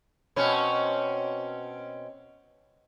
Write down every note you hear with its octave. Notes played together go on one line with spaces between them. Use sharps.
B2 C4 C#4